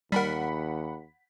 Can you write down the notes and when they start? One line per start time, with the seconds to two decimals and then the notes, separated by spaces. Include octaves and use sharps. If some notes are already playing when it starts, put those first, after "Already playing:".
0.12 D#2 G3 A#4 F#5 B5 B6